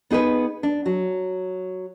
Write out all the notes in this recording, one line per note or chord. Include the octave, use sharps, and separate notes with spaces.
B3 D#4 G#4 A4 B4
D4
F#3